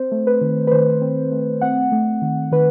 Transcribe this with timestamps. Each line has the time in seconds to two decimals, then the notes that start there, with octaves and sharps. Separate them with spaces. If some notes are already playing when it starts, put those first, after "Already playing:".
Already playing: C4 C5
0.12 A3
0.27 B4
0.41 D#3
0.67 B4
0.71 D#3 C5
1.02 C4
1.32 A3
1.61 C4 F#5
1.92 A3
2.22 D#3
2.52 D#3 B4